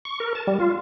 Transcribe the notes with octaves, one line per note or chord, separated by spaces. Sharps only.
C#6
A#4
A5
G3
F4